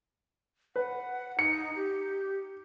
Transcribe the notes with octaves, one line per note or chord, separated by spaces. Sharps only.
B4 F#5
D#4 C#7
G4